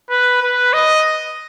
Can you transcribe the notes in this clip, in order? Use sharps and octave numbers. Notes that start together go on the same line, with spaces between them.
B4
B4
D#5